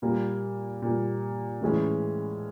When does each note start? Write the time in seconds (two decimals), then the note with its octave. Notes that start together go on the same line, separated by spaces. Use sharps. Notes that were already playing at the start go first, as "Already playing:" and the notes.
0.02 A#2 G3 A#3
0.82 A#2 G3 A#3
1.61 A2 E3 G#3 C#4 E4